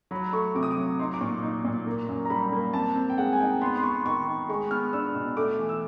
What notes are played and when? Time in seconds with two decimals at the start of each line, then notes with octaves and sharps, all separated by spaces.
0.11 F#3 B5
0.33 A3 C#6
0.55 C3 D6
0.63 D#6
0.71 D6
0.77 F#3
0.99 D#4 C6
1.14 D6
1.21 A#2 C#6
1.43 D#4
1.65 A#2
1.86 A#3
2.08 F#2
2.25 A#5
2.30 G3 B5
2.52 A#3
2.73 C4 A5
2.95 C4
3.10 G5
3.18 G#3 F#5
3.33 G#5
3.40 D#4 G5
3.61 B3 C6
3.77 C6
3.83 B3 C#6
4.05 D#3 C#6
4.27 D#3
4.49 G#3 C#6
4.71 B3 F6
4.93 D4 E6
5.15 B2
5.37 A3 D6
5.59 E3
5.69 E6